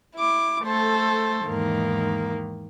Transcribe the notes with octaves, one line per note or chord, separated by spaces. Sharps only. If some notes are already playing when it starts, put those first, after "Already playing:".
E4 D6
A3 A4 C5
E2 G#2 D#3 A#3